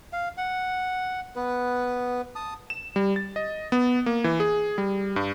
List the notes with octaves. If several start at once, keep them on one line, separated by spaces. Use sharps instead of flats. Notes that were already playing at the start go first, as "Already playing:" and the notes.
F5
F#5
B3 B4
A5 D#6
E7
G3
A6
D#5
B3
A#3
E3
G#4
G3
G2